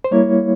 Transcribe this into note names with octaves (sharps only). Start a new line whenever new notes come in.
C5
G3 A#3 E4 C#5